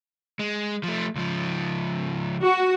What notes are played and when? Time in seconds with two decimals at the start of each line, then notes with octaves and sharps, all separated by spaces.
0.39 G#3
0.83 F3 A3
1.15 C#2 F3
2.42 F#4